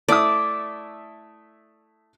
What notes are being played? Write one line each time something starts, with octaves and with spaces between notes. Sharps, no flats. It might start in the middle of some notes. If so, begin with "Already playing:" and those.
A3 E4 D5 D#6